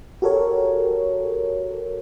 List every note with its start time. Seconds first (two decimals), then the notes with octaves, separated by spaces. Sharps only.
0.22 F#4 G4 A4 A#4 C#5